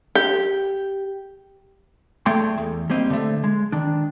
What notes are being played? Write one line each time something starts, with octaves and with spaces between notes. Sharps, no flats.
G4
A3 G#4 A4 D5 G5 C6
E2
G3 A#3 C4 D#5
D3 A3
G#3
D#3 D4